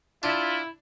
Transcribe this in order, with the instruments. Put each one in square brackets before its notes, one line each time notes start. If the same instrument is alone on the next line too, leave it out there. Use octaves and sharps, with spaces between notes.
[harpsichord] D4 [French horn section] E4 [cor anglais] F4